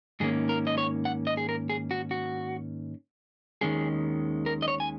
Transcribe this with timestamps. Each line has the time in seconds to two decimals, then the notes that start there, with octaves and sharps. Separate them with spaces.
0.20 G#2 D#3 A#3 C#4 G#4
0.49 A#4
0.67 D#5
0.78 C#5
1.05 F#5
1.27 D#5
1.37 G#4
1.49 A#4
1.70 G#4
1.91 F#4
2.11 F#4
3.61 D#2 D#3 G#3 C#4 G#4
4.46 A#4
4.62 D#5
4.68 C#5
4.80 G#5